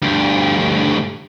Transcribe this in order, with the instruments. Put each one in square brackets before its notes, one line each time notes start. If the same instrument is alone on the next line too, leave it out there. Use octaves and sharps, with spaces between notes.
[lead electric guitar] D2 G2